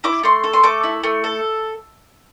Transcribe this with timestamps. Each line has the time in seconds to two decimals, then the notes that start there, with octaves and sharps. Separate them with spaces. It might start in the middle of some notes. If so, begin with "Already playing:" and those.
0.04 E4 D6
0.23 A3 C6
0.44 A4
0.53 C6
0.63 A3 D6
0.83 E4
1.03 A3
1.24 A4